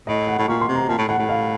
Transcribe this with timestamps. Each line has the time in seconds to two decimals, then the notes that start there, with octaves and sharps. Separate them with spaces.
0.07 A2 D#5
0.27 F#5
0.38 A2
0.48 A#2 C#6
0.61 C6
0.68 C3
0.75 A#5
0.88 A#2 A5
0.98 A2
1.08 A2 F#5
1.19 A2
1.29 F5